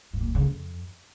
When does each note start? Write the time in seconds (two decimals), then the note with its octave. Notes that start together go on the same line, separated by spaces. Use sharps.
0.14 G#2
0.21 A#2
0.28 E2
0.35 C#3
0.42 F2